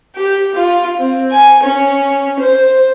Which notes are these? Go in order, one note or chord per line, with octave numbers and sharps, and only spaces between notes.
G4
F4
C4
G#5
C#4
C5